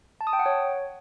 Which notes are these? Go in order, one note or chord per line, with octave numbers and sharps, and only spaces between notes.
A5
D#6
G5
F#5
C#5